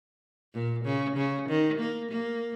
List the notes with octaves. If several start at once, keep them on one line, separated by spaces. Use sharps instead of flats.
A#2
C#3
C#3
D#3
A#3
A#3